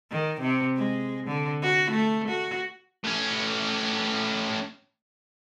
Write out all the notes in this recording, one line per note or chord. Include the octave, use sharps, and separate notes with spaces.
D#3
C3
G#3
D3
F#4
A3
F#4
A2 C#4